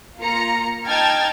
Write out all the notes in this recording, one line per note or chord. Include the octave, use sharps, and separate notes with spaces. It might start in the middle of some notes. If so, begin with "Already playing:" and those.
A#3 F4 A#5 C#7
D#4 G5 A5 F6 G#6 A6